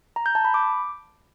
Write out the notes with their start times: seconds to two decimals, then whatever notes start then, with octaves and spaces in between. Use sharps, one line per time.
0.16 A#5
0.26 G6
0.35 A5
0.45 B5
0.54 D6